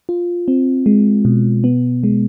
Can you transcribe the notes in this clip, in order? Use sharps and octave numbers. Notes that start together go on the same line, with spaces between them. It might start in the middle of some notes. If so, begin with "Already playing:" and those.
F4
C4
G#3
B2
B3
G#3